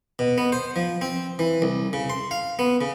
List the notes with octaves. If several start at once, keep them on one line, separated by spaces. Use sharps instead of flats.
B2
B3
C5
F3
C4
E3
C2
C#3
C6
F5
B3
C#3